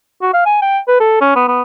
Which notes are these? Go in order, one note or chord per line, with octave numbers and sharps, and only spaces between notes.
F#4
F5
G#5
G5
B4
A4
C#4
B3
B3